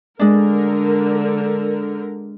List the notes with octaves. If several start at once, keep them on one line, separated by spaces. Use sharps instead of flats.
D3 G#3 D4 A#4